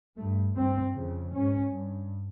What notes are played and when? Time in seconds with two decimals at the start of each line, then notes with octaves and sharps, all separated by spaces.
0.17 G2 A3
0.56 G2 C4
0.95 F2 C#3
1.34 G#2 C#4
1.72 G2